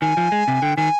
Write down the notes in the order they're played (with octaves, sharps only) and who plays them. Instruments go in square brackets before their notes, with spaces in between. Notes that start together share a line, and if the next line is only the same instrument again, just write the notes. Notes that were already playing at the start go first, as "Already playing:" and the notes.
[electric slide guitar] D#3 [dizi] G#5
[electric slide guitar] F3
G#3
C3
[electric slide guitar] D3 [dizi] G5
[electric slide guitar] D#3 [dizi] G#5